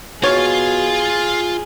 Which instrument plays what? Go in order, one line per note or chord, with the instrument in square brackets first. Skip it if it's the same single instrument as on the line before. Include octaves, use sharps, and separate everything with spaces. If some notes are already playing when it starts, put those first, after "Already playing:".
[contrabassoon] B2 [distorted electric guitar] F4 F5 [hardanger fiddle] G#4 [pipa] C#5